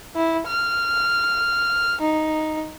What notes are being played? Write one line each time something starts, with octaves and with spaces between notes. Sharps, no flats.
E4
F6
D#4